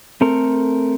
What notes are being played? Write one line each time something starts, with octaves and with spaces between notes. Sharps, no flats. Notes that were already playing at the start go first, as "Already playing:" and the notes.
A3 C4 A4 A#4